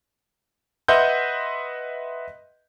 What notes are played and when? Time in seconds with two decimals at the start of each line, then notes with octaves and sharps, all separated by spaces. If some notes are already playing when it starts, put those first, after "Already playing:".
0.88 B4 D#5 E5 F#5 C6 G6